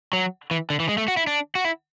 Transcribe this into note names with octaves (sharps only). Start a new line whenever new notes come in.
F#3
E3
D3
E3
G#3
A3
F#4
E4
D4
F#4
E4